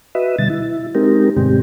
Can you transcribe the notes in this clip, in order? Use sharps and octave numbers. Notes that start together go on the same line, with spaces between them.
F#4 B4 D#5 E5
B2 D3 G3 A6
E4
G#3 C4 D#4 G4 A#4
G2 B2 D3 G#3 C4 G4